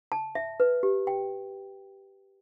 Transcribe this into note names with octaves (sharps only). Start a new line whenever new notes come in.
A5
E5
B4
G4
G5